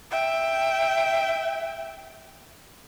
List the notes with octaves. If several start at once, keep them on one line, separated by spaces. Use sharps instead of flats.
E5 G5